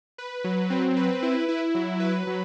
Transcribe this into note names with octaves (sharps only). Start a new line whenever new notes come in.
B4
F#3
C4
B4
E4
E4
F#3
B4
F#3